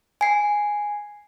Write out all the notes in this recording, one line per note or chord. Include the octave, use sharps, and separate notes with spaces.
G#5 C7